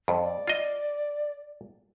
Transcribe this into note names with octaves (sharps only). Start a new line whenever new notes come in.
F2
D5
F4 D#5